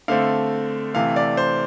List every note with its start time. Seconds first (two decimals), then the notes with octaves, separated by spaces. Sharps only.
0.08 D3 A3 C4 F5
0.94 C3 E3 A3 F5
1.16 D5
1.37 C5